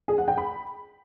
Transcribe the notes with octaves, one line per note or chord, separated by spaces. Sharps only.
G#4
F#5
G5
B5